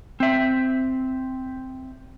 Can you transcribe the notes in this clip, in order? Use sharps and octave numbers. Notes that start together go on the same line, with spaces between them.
C4 E5